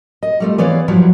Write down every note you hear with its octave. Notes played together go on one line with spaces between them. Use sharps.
D#5
G3 A3 F4
E3 B3 C#5 D5 F5
G2 F3 F#3 E4